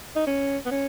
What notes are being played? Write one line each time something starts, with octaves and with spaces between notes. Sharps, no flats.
D#4
C#4
B3
C#4